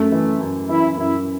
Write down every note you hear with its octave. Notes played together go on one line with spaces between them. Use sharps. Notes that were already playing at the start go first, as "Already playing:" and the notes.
Already playing: F#2 A3
E3
F#2
E3 E4
F#2 E4